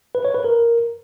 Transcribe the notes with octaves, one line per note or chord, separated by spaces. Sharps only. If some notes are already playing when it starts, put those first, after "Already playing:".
B4
C#5
B4
A#4